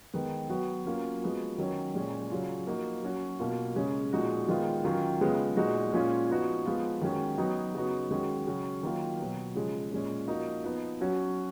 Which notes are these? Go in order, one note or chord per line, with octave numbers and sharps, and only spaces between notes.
D#3 G#3 B3
F#3 B3 F#4
F#3 A#3 C#4 F4
F3 G#3 B3 F#4
D#3 F#3 C#4
A#2 F3 G#3 C#4
C#3 F#3 C#4 F4
F3 A#3 D#4 F#4
F#3 C#4 F#4
B2 A#3 F4
C#3 G#3 C#4
A#2 F3 G#3 D#4 F#4
D#3 G#3 B3 F4
D#3 F#3 C#4 F4
C#3 G#3 B3 F4
A#2 G#3 D#4 F#4
A#2 G#3 C#4 F4
F3 B3 D#4 F#4
F3 G#3 B3 F4
D#3 G#3 C#4 F#4
F#3 B3 D#4 F#4
C#3 F#3 B3 D#4 F#4
D#3 G#3 C#4 F#4
C#3 F#3 C#4 F#4
D#3 F#3 A#3 F4
B2 F#3 B3
C#3 F3 G#3
A#2 G#3 C#4
F3 A#3 D#4 F#4
F3 B3 D#4
F#3 C#4 F#4